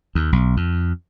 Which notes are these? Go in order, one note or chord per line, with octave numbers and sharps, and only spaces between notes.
D#2
B1
F2